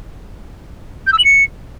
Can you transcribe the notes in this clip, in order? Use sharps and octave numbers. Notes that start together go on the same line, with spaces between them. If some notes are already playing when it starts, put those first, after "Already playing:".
G6
E6
F#7
C#7